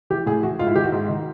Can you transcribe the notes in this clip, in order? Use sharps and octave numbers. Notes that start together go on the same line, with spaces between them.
E3 G4
A2 G#4
E3 F#4
G#2 F4
E4
D#3 G4
F#4
G#2
D#3